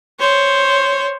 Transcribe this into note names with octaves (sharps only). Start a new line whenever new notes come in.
C5 C#5